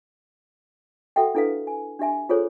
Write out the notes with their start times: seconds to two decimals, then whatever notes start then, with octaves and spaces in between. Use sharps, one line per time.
1.16 F#4 A4 E5 F#5 G5
1.35 D4 E4 A4 B4 F5
1.67 G#5
1.99 D4 G4 E5 G#5
2.29 F4 G#4 A4 C5 C#5